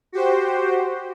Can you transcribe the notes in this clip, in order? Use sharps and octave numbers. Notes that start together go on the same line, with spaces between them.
F#4 G4 C5